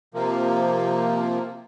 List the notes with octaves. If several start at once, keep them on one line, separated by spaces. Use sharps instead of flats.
C3 F3 A#3